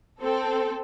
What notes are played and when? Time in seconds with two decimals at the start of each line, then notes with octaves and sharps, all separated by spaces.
0.21 C4 A4